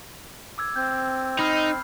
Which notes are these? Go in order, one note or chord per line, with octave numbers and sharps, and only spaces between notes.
D6 E6 G#6
C4 G6
D#4 B5 F6 C7